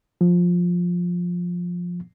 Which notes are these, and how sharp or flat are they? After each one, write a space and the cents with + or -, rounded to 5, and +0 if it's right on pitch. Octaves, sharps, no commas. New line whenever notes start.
F3 +10